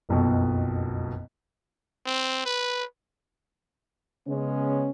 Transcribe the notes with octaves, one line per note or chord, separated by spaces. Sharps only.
F#1 B1 F2 B2
C4
B4
C#3 G#3 B3 C#4